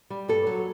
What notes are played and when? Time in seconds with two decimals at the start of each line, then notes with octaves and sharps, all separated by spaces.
0.10 G3
0.28 G2 A4
0.47 F#3